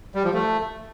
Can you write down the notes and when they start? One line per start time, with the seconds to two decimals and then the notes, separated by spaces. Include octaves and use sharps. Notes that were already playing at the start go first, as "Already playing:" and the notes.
0.15 G3
0.24 F3
0.33 A3